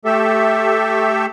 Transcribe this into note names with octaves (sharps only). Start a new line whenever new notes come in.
A3 G4 A4 E5